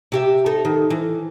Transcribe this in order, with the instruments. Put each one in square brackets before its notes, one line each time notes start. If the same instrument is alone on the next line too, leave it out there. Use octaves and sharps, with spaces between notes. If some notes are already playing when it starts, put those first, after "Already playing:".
[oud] C3 G4 E5
D#4 A4
D#3
E3